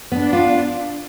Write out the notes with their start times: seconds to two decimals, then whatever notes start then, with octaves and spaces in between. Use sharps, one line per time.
0.12 B3 D4
0.33 F4